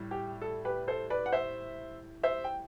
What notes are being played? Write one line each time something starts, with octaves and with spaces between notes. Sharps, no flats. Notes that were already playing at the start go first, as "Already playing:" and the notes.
Already playing: A2 G3
G4
A4
G4 B4
A4 C5
B4 D5
F#5
C5 E5
C5 E5
G5